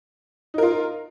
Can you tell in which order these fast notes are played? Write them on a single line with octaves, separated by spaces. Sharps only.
D#4 A#4 F4